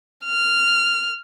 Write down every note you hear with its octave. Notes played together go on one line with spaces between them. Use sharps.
F6